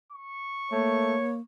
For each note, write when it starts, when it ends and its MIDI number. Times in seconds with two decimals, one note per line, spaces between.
0.12 1.42 85
0.72 1.16 57
0.72 1.40 58
0.72 1.33 73